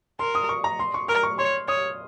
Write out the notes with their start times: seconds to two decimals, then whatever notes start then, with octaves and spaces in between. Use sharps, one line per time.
0.19 A#4 C6
0.35 D#6
0.49 C#6
0.64 A#5
0.79 C6
0.94 C#6
1.08 A#4 F6
1.23 C#6
1.38 C#5 C6
1.68 C#5 D#6